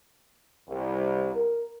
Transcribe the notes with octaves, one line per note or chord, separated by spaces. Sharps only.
C2
A#4